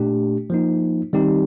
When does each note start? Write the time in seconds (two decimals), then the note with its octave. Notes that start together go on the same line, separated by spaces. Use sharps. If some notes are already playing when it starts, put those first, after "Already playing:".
Already playing: A#2 A3 D4 G4
0.50 F3 A#3 D#4
1.13 D#3 G3 C4 D#4 G4